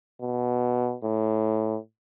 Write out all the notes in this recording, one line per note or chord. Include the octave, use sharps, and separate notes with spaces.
B2
A2